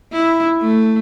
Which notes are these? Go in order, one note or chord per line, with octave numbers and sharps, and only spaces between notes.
E4
A3